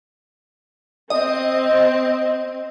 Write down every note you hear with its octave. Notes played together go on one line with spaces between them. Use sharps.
C4 D#5